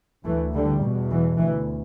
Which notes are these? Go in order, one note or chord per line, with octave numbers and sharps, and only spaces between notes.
D2 E3 A3
D3 G3
E2 B2
E3
D2 E3